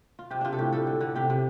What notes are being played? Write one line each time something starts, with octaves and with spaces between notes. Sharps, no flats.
F4
C3 G4
C3 D4 F4
A4
A2 G4
G3 A4
D3
D3
C3 G4
C3